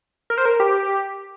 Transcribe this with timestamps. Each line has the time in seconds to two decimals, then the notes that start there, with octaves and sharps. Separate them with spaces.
0.30 A#4
0.38 C5
0.45 A#4
0.60 G4